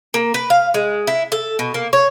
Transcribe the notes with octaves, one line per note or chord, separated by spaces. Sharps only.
A#3
B4
F5
G#3
E4
A4
B2
A#3
C#5